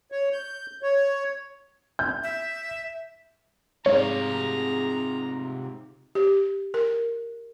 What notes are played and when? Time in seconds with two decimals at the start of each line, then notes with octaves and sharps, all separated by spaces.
0.12 C#5
0.33 G6
0.82 C#5
1.99 G6
2.24 E5
3.86 G#2 C3 F4 G#4 C#5 A#5
6.15 G4
6.74 A#4